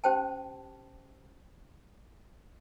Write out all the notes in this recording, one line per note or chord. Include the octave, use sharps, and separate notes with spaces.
C#4 G4 C5 G5 A5